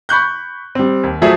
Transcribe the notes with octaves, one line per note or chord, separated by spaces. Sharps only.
B5 C#6 F#6 G6
G3 C4
D#2
F3 F#3 A3 G#4 E5